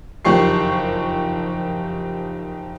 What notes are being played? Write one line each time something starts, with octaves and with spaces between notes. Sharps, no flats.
F#1 F2 D#3 G4 C#6 C7